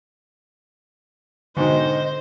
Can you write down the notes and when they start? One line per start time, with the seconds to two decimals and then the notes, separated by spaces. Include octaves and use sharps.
1.57 G#2 B2 D3 D#3 C5 D#5